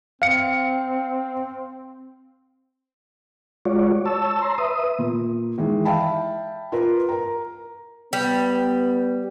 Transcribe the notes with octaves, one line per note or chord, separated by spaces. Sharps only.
C4 F5 C#7
G#3 F4 F#4 C#5 D5
C#5 A5 E6
A#5 C6
B4 E5 D#6
A#2
D#3 E3 G#3
E5 F5 G5 A5 B5
F4 A#4 B4
A#4 A#5
G3 B3